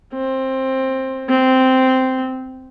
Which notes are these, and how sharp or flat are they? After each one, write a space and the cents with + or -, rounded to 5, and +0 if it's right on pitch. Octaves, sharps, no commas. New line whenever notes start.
C4 +15
C4 -10